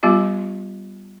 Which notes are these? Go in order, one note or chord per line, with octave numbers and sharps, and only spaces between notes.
G3 B3 F4 G4 D#5